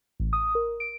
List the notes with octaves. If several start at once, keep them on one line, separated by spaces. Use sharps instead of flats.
A1
D#6
A#4
D7